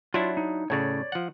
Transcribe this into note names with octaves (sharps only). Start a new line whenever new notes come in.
F#3 D4 E4 F4
D#4
A2 C#3 C#5 D5
F3 F#5